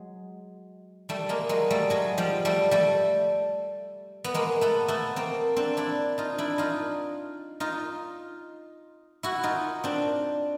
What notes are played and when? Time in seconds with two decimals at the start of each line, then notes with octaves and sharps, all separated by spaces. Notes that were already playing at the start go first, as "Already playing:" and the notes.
Already playing: F#3 G#3
1.09 G3 A3
1.29 G#3 A#3
1.49 F#3 G#3
1.70 G3 A3
1.90 F#3 G#3
2.18 F3 G3
2.45 G3 A3
2.71 G3 A3
4.24 B3
4.34 G#3 A#3
4.61 A3 B3
4.88 A3 B3
5.16 A#3 C4
5.56 C4 D4
5.77 D4 E4
6.18 D#4 F4
6.38 D4 E4
6.58 D#4 F4
7.60 D#4 F4
9.23 E4 F#4
9.43 D#4 F4
9.84 C4 D4